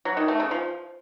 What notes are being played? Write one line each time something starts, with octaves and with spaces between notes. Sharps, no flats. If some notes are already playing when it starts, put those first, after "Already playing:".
F#3
D#3
A3
C#3
F3